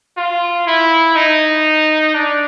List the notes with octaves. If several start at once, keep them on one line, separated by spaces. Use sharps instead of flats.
F4
E4
D#4
D4